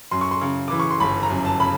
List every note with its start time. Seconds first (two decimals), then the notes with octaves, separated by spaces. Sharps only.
0.11 F#2 C6
0.21 C#6
0.31 C6
0.41 C#3
0.68 E3 D6
0.80 C#6
0.91 C6
1.00 G1 B5
1.23 A#5
1.30 F#2
1.45 A5
1.60 C#3 B5